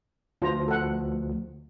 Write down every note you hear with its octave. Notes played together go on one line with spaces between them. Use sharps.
D2 F3 F4 C5 A#5
A4 F#5